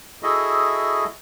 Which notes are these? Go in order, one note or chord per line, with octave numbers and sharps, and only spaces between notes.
E4 F#4 G#4 A4 D#5 E5